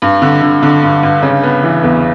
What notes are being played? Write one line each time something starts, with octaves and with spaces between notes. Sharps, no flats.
G2
D3
D3
D3
G2
G2
C#3
B3
E3
E2